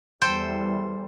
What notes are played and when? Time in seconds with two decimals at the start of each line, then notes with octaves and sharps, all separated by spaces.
0.22 E2 E3 G3 A4 C5 G5